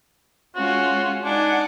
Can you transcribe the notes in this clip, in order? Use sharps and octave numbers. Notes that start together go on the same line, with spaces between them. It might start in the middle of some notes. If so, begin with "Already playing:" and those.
G#3 C#4 F4 F#4
D4 D#4 F#5 G#5